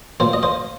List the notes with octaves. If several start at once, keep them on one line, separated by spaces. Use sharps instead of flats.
A#2 C5 F5
D#5
C5 F5